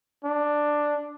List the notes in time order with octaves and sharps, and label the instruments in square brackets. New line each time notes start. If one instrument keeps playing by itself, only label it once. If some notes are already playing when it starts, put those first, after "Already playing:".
[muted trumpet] D4